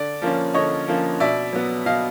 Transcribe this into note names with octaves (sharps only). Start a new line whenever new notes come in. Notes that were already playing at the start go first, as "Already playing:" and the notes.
Already playing: D3 D5
F3 A#3 C#4
D3 C#5 D#5
F3 A#3 C#4
B2 D5 E5
F#3 B3
B2 D#5 F5